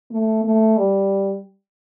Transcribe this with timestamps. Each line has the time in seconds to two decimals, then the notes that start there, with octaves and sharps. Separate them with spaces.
0.11 A3
0.44 A3
0.77 G3